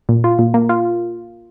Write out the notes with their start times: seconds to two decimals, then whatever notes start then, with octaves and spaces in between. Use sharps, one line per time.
0.09 A#2
0.24 F4
0.39 A#2
0.54 A#3
0.69 F4